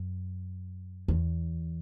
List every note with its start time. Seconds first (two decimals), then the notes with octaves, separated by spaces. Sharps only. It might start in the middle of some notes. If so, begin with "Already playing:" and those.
Already playing: F#2
1.08 E2